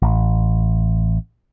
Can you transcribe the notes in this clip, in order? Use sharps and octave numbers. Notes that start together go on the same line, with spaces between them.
A1